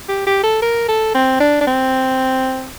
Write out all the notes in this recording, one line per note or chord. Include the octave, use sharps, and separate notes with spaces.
G4
G4
A4
A#4
A4
C4
D4
D4
C4